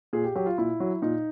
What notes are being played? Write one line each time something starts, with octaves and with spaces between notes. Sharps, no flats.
A#2 G#4
G4
F#3 G4
F4
A#2 E4
F#3
A#2 D#4